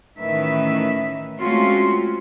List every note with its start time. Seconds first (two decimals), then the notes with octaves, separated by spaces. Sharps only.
0.19 A2 D#3 E3 C#4 B4 E5
1.40 G#3 A3 C4 C#4 F4 F#4